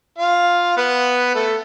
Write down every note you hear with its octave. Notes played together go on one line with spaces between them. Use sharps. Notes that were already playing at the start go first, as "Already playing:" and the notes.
F4 F5
B3 B4
A3 A4